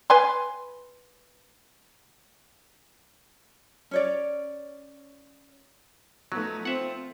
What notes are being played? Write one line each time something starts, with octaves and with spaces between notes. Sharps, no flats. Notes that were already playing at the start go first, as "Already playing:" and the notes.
B4 G#5 C6
C#4 C#5 D5
F3 F#3 A3 B3 D#4
C4 F4 E5 F#5